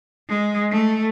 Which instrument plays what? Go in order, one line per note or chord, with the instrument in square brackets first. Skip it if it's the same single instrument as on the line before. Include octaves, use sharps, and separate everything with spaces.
[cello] G#3
A3